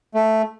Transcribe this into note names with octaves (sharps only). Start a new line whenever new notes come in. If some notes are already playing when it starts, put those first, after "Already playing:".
A3